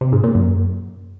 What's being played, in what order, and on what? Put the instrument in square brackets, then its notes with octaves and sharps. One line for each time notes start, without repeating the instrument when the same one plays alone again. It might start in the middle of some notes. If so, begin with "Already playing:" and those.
[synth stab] C3
G#2
A#2
F#2